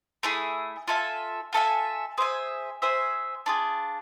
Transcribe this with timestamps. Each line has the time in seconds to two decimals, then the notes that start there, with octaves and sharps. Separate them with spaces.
0.23 A3 E4 G#4
0.88 F4 A4 E5 G#5
1.53 F4 A4 E5 G#5
2.18 G#4 C5 E5 G#5
2.82 G#4 C5 E5 G#5
3.46 D4 F4 G#4